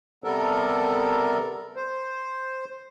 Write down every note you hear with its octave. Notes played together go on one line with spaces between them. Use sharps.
C3 G3 B3 A4 A#4
C5